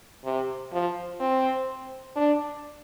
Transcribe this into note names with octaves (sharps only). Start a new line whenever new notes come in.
C3
F3
C4
D4